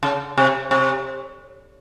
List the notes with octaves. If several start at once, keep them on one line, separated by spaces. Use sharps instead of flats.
C#3
C3
C3